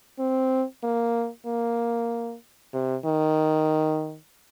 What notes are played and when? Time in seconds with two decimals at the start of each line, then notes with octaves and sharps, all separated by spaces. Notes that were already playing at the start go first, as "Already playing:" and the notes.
0.19 C4
0.84 A#3
1.46 A#3
2.74 C3
3.05 D#3